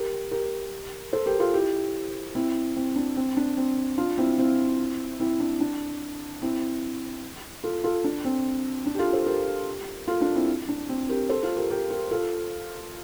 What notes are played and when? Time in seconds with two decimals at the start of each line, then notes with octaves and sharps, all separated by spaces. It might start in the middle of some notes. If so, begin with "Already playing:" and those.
Already playing: G4 A#4
0.31 G4 A#4
1.13 A4 C5
1.26 G4 A#4
1.40 F4 A4
1.54 E4 G4
2.35 C4 E4
2.76 C4
2.96 D4
3.16 C4
3.37 D4
3.57 C4
3.98 D4 F4
4.18 C4 E4
4.38 C4 E4
5.20 C4 E4
5.40 D4
5.60 D4
6.42 C4 E4
7.64 F4 A4
7.84 F4 A4
8.04 D4
8.25 C4
8.86 D4
8.95 G4
8.99 F4 A4
9.13 A4 C5
9.26 G4 A#4
10.08 F4 A4
10.21 D4 F4
10.35 C4 E4
10.69 D4
10.89 C4
11.09 G4 A#4
11.29 A4 C5
11.43 F4 A4
11.57 G4 A#4
11.70 G4 A#4
11.90 G4 A#4
12.11 F4 A4